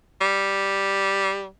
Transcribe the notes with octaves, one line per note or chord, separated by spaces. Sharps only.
G3